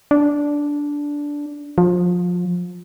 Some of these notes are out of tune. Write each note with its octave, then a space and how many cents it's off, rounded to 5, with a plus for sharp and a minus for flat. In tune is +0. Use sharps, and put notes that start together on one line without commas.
D4 -10
F3 +25